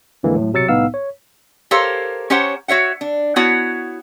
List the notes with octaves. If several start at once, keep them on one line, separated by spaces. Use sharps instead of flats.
F2 D3 E3 G#3 A#3
A2 F#3
B1 C3 F#3 E6 A6 C#7
C2 A2 B3 D#4 F5 E6
C#5
G4 A4 A#4 C5 C#5 F5
C#4 G4 C5 C#5 F#5 A#5
F#4 C#5 E5 F#5
D4
B3 E4 F#4 C#5 F#5 A5